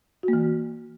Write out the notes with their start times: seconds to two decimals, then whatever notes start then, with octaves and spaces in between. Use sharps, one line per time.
0.23 F#4
0.28 A#3
0.33 E3